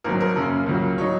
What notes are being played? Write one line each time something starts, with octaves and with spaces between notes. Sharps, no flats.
G#1 G#2 F#3 A#4
A#4
F#2 C#3 A#3 C#4
C#2 C#3 F#3 A#3
F#3 D#4 C#5